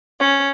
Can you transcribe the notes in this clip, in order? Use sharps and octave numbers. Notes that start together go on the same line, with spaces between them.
C#4